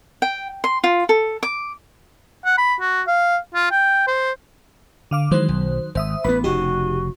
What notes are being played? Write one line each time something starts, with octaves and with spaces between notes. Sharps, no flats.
G5
C6
F4
A4
D6
F#5
B5
F#4
F5
F4
G5
C5
D3 F5 D6
D#3 E3 F#3 G#3 C5
B1
G#1 C5 E5 D#6
A1 B3 B4 B5
F1 C#3 D#4 F#4 G4